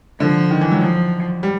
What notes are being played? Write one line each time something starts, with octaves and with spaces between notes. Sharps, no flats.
D3 F3
D#3
E3
F#3
F3
G3